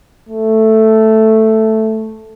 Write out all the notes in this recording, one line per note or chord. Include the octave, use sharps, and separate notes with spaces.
A3